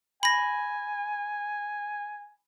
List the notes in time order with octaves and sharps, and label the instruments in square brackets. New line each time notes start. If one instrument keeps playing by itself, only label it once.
[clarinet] G#5 [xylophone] B5 A#6